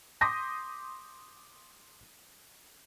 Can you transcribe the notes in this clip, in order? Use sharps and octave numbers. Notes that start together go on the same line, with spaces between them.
C6 D6 D#6 G6 A#6 B6